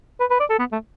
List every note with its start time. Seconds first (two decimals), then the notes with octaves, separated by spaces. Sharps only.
0.20 B4
0.30 B4
0.40 D5
0.50 A4
0.59 B3
0.72 A3